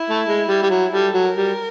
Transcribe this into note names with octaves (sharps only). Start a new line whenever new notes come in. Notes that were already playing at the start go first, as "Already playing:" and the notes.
Already playing: E4
A3
G#3
G3
G3
F#3
G3 A4
F#3
A#4
G3